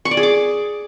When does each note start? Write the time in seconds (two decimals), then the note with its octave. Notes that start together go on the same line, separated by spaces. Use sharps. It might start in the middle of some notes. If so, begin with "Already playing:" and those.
0.05 C#6
0.11 D5
0.17 G#4
0.23 D6